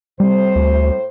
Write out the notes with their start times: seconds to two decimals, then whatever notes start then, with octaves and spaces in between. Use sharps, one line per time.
0.20 A2 G3 C4 C5
0.56 D2